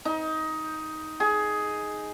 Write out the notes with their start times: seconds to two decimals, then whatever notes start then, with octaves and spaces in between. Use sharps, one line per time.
0.05 D#4
1.20 G#4